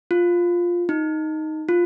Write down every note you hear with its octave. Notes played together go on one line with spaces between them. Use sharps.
F4
D#4
F4